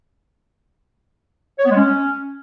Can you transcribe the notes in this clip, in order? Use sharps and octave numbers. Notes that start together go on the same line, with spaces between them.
C#5
B3
G#3
C#4